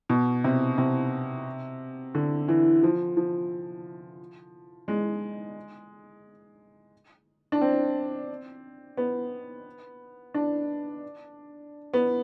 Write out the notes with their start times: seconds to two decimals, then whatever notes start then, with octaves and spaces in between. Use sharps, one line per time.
0.09 B2
0.44 C3
0.78 C3
2.15 D3
2.48 E3
2.83 F3
3.17 F3
4.88 G#3
7.52 D4
7.61 C4
8.97 B3
10.34 D4
11.94 B3